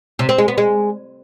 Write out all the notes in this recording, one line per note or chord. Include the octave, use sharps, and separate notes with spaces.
C3
C4
G#3
B3
G#3